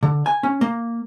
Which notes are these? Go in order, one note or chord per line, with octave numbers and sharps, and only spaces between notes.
D3
G#5
C#4
A#3